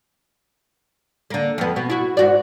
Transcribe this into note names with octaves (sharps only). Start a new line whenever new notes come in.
D3 A#3
F2 B3
B2 B3
E4 F#4
G#2 F#4 D5